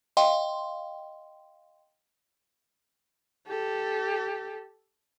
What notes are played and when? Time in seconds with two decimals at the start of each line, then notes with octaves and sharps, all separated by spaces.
0.17 D#5 F5 G5 C6
3.47 G4 A4